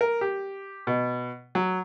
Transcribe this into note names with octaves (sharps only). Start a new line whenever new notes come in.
A#4
G4
B2
F#3